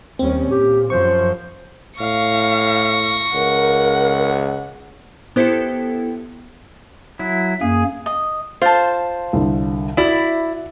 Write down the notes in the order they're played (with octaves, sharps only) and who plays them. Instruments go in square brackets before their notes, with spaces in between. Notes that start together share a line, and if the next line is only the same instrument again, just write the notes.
[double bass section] D#2 G3 C#4 [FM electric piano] C4
[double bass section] A#2 [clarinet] G4
[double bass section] F#2 F3 [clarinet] C5 [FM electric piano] C#6
[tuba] A2 [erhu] F5 [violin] C#6 A#6
[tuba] C#2 [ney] A#4 [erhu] F#5
[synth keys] B3 E4 A4 [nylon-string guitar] G4 C5
[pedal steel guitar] F#3 E4
[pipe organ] F#2 A#3 [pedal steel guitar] G#4
[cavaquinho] D#5
[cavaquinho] F4 A5 [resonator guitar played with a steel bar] C5
[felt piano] C2 D3
[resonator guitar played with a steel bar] E4 D5 [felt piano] F#4